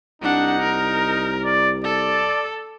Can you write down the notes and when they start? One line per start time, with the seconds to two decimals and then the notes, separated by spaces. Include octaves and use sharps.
0.22 C2 D4 D#4 F#5
0.60 A#4
1.44 D5
1.84 A4 D5